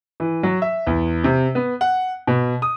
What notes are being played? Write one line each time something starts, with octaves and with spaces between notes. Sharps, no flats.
E3
F#3
E5
E2
C3
B3
F#5
B2
D#6